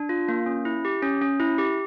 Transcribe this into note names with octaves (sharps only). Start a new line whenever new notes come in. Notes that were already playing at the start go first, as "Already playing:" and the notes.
Already playing: D4
F4
A#3
C#4
E4
G4
C#4
C#4
E4
G4